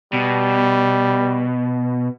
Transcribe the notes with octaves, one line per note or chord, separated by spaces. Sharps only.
B2 G3